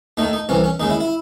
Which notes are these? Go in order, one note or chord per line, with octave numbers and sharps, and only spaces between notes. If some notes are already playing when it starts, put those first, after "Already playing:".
D#2 D#3 A3 D#4
D#4
C2 C3 E3 C#4
C#4
D#2 C#3 G#3 D#4
E4
E4